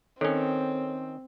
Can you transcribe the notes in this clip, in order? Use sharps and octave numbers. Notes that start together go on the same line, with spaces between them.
D#3 C4 C#4 A4 C#5